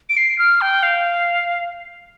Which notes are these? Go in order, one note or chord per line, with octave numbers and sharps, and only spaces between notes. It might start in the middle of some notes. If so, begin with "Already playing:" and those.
D7
C7
F6
G5
F5